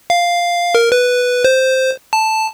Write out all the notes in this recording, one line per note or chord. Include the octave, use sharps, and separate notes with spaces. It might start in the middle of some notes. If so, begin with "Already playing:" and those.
F5
A#4
B4
C5
A5